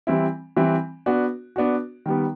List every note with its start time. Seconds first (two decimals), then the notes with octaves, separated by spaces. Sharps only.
0.07 E3 G3 C4 E4
0.56 E3 G3 C4 E4
1.06 B3 D4 F#4
1.56 B3 D4 F#4
2.06 D#3 G3 B3